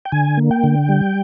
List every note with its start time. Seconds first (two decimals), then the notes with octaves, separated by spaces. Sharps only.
0.05 G5
0.12 D3 G#5
0.37 A#3
0.51 G5
0.64 D3
0.89 G3